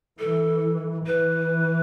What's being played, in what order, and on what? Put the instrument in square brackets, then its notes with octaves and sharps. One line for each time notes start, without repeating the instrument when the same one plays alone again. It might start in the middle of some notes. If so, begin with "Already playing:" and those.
[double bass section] E3 [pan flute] A4
[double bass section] E3 [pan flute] B4